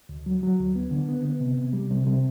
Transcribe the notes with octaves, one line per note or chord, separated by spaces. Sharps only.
D2
F#3
F#3
D2
B3
D3
B3
B3
C3
C3
G3
C3
C3